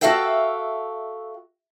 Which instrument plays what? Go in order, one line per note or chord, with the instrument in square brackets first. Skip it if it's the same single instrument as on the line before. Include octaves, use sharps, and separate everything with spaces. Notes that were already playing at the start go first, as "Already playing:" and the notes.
[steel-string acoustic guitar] F#4 G4 A4 E5 F5 G5